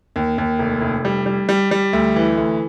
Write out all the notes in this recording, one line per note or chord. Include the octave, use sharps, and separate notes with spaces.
D#2
D#2
F1
F1
G3
G3
G3
G3
D2
E3
D2